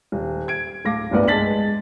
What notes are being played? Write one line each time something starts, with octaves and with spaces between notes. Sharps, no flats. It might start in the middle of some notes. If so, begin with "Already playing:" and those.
D#1
G#6 D7
D1 A3 F5 D6 A#6
D1 G1 C2 A3 B3 D5
G#3 A5 A6 B6 F#7